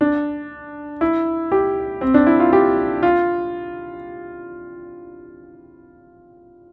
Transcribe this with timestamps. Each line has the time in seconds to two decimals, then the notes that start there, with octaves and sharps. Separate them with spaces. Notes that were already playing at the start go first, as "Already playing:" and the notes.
0.01 D4
1.01 E4
1.52 G4
2.01 C4
2.14 D4
2.27 E4
2.40 F4
2.53 G4
3.03 F4